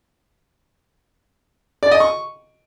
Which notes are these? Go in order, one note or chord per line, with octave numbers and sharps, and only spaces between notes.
D5
D#5
C#6